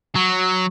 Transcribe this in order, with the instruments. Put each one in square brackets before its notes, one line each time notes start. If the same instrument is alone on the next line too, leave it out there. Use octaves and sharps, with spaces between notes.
[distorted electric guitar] F#3